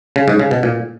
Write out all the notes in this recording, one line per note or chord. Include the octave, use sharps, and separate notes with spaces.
C#3
G#2
C#3
B2
A#2